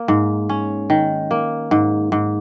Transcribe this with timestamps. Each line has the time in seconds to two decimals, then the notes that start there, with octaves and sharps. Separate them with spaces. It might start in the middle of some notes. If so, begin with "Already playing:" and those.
Already playing: A#3
0.08 G#2
0.49 C#4
0.90 D#3
1.31 A#3
1.71 G#2
2.12 G#2